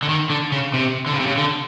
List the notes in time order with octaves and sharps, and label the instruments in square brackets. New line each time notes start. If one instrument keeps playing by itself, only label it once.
[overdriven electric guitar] D3
D#3
D3
C#3
C3
D3
C#3
C3
C#3
D3